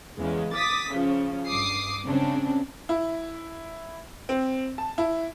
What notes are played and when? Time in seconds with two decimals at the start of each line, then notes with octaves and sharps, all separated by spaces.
0.18 E2 C#3 G#3
0.55 D6 D#6 A6 B6
0.92 C#3 F3 C#4
1.48 G2 D6 D#6 C7
2.05 C#3 C4 D4
2.89 E4
4.29 C4
4.78 A5
4.98 E4